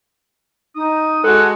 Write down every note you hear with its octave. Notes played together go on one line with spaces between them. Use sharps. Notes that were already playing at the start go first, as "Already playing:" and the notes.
D#4 D#6
G#3 F#4 A4 F#5